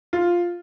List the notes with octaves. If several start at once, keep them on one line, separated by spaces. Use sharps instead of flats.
F4